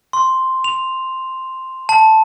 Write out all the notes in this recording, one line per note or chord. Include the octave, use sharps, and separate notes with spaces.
C6
F7
A5